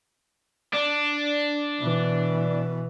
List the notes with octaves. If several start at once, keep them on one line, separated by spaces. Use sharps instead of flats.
D4
B2 E3